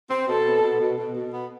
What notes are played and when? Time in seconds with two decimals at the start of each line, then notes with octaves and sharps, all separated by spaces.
0.11 C4
0.28 B2 A4
0.45 B3
0.63 B2
0.80 B2
0.98 B2
1.15 B2
1.33 B3